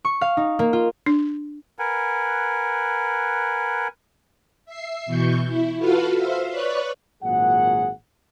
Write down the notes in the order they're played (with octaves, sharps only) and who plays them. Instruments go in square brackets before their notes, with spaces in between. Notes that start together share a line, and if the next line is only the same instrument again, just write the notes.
[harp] C#6
F5
D#4
A#3
F4
[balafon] D4
[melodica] A#4 B4 F#5 G#5
[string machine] E5 C7
B2 E3 C#6 G6
E4
F4 F#4 A4 B4 F5
C5 E5 F5
B4 C#5 D5 C#6 F#6
[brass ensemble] G#1 A#2 F#3 G#4 F#5